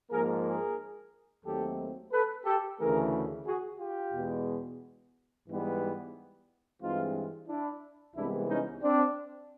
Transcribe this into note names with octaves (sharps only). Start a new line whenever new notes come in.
G#2 F3 A#3 G#4 A#4
G#4 A#4
D#2 D#3 F#3 A3 C4 G4 A4
A4 B4
G4 A4
D2 C#3 E3 A3 G#4 A#4
F#4 G#4
F4 G4
E2 B2 G#3 B3
G#2 E3 G3 B3
G2 E3 G#3 C4 D#4 F4
D4 E4
C2 C3 E3 G#3 B3 D4 E4
C#4 D#4
C4 D4